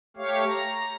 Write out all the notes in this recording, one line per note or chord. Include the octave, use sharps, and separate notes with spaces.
A3 G4 C#5 F5
A#5